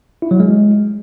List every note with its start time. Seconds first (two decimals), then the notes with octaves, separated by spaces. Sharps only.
0.22 E4
0.31 F#3
0.40 G#3